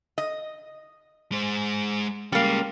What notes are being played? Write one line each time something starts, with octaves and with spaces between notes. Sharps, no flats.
D#5
G#3 C5
G3 G#3 A#3 C#4